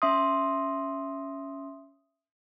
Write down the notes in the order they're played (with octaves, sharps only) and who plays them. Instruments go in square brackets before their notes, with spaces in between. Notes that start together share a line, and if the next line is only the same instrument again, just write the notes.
[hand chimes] C#4 E5 C6 D#6